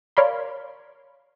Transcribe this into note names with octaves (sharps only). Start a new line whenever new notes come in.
A#4 C#5 D5 F5 B5 C6